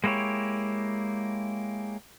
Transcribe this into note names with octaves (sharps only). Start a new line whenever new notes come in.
G#3 A#3 E4 G4 C#5